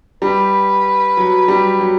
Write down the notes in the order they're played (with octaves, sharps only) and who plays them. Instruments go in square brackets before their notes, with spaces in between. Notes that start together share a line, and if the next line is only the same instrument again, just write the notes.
[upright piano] G3 [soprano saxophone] B4
[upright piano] F#3
G3
F#3